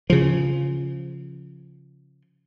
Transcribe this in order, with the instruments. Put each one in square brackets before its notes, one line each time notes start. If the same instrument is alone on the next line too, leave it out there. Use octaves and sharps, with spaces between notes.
[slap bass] C#3 F3